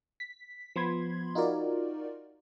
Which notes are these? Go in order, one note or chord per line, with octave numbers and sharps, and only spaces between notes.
B6
F3 B3 B5 C6 G#6
D#4 F4 F#4 A#4 D5